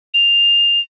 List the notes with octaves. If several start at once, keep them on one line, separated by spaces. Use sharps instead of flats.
F7